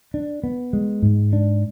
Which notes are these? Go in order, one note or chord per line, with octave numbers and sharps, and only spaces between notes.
D4
B3
G#3
G#2
D4